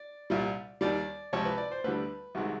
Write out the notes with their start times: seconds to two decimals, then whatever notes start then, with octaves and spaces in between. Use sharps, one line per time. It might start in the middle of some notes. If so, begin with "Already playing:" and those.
Already playing: D5
0.30 C2 A#2 G3
0.81 D#2 D#3 G3 D5
1.33 C#2 C3 F3 C#5
1.45 B4
1.58 D5
1.72 C5
1.84 D2 D3 G3 B4
2.35 C2 C3 D#3 G#3 F#4